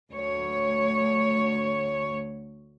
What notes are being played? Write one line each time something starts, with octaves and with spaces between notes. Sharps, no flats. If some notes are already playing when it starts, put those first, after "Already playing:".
D2 C#5